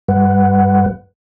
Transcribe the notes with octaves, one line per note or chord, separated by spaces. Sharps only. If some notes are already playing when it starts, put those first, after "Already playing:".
G2 G3 B4 F#5